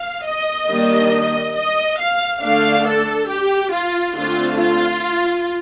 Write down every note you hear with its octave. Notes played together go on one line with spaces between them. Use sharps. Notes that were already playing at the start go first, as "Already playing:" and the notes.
Already playing: F5
D#5
D#3 G3 A#3 D4
D#5
F5
D3 A3 D4 F5
A4
G4
F4
D3 A3 C4 F4
F4